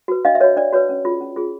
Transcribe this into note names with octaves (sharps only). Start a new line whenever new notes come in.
F#4 B4
D4 D#5 F5
E5
F#4 B4 C#5 D#5
D4 D5
F#4 B4 C#5
C#4
F4 G#4
C#4
F4 G#4